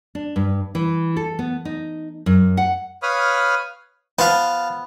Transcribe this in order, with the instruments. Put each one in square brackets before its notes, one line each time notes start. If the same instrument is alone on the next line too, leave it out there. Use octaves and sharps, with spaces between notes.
[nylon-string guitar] D4
G2
E3
A4
B3
D#4
F#2
F#5
[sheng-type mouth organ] B4 C#5 F5 B5 D#6 F6
[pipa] F3 B3 [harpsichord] F5 A5